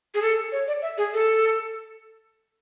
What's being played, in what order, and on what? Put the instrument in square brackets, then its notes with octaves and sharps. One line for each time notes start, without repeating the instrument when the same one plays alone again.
[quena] G#4
A4
C#5
D5
E5
G#4
A4